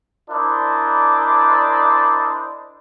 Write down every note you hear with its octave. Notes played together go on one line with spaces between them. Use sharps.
D4 E4 A#4 C5 D5 D#5